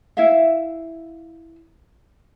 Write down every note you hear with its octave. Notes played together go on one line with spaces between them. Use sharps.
E4 E5 F5